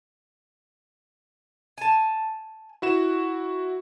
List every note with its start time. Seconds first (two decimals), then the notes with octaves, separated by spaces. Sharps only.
1.78 G#5 A5
2.82 E4 F#4 E7